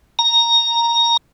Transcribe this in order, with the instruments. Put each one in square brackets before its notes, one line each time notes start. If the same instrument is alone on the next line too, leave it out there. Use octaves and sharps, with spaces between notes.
[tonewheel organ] A#5